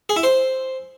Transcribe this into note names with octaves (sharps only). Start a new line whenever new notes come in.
G#4
E4
C5